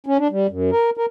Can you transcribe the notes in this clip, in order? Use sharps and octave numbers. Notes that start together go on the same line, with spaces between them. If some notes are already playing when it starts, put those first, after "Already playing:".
C#4
D4
G3
F#2
A#4
A#4